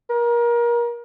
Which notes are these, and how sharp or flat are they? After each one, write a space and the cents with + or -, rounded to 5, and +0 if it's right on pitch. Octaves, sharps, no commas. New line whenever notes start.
A#4 +30